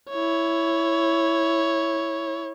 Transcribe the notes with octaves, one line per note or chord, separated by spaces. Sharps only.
E4 C#5